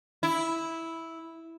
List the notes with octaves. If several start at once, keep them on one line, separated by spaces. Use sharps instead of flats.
E4